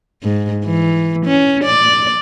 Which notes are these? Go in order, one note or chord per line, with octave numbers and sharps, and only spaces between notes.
G#2
E3
C#4
D5